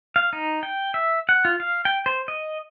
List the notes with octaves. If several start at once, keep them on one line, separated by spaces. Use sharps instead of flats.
F5
D#4
G5
E5
F#5
F4
F5
G5
C5
D#5